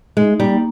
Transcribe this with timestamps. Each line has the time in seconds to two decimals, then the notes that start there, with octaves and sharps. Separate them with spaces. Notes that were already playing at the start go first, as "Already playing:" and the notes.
0.17 G#3 D#4
0.40 G3 A#3